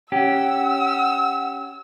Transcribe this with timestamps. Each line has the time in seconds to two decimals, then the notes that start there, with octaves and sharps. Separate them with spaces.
0.12 C#4 G4 F#5 E6